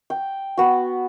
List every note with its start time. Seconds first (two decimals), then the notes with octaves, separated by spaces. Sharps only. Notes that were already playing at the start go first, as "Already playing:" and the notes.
0.10 G5
0.57 B3 F#4